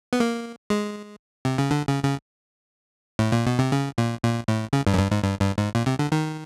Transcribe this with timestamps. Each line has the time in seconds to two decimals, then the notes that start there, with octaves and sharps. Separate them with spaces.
0.13 B3
0.20 A#3
0.70 G#3
1.45 C3
1.58 C#3
1.71 D3
1.88 C#3
2.04 C#3
3.19 A2
3.32 A#2
3.47 B2
3.59 C3
3.72 C#3
3.98 A#2
4.23 A#2
4.48 A2
4.73 C#3
4.87 G2
4.94 F#2
4.99 G2
5.11 G#2
5.23 G2
5.40 G2
5.58 G#2
5.75 A#2
5.86 C3
5.99 D3
6.12 D#3